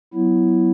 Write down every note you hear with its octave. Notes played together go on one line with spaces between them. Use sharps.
F#3 B3 E4